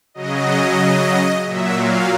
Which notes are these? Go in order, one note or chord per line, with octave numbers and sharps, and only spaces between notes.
C#3 F#3 D#5
A#2 F#3 E5
F5